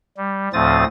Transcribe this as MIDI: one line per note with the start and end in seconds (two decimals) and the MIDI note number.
0.17 0.48 55
0.53 0.84 38
0.53 0.84 45
0.53 0.84 53
0.53 0.84 60
0.53 0.84 87
0.53 0.84 93